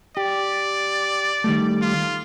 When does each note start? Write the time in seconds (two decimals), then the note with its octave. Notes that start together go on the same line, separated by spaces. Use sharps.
0.17 G4 D5
1.44 D#3 G3 A3
1.82 F4